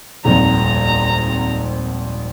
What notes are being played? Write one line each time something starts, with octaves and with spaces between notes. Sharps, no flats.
D#1 G#1 F2 A#5